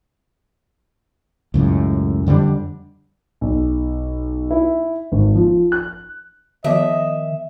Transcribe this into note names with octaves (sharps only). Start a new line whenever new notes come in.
C#2 F#2 A2
F2 D3 G3 D4
B1
E4
G#1
F3
F#6
D#3 F3 B3 F#4 D#5 E5